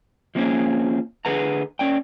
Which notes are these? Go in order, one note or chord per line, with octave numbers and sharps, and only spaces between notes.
F3 G#3 A#3 C4 C#4 G#4
D3 G#4 B4 F#5 A#5
C#4 D5 G5